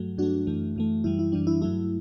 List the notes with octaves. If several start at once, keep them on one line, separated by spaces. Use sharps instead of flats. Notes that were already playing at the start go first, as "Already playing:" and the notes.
Already playing: G2 F#3 A3
G2 F#3 A3 D4 F#4
F#2 E3 A3
F#2 E3 A3
F#2 E3 G3 E4
E4
F#2 E3 G3 D4
E4
G2 F#3 A3 E4